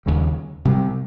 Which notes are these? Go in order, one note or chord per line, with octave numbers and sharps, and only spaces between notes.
D#2 C#3 G3
C3 G3 C4